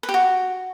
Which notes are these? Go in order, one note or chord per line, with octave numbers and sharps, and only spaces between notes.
B4
G4
F#4